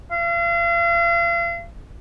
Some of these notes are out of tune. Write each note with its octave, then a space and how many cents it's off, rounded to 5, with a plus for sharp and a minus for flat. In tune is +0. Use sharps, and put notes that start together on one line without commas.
F5 -40